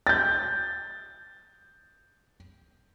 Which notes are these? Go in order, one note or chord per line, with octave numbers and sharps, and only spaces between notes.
G6 A6